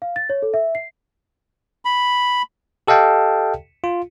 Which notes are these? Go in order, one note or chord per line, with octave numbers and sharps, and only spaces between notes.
F5
A6
C#5
A4
E5
C7
B5
G4 A4 D#5 F5 G5 A5
F4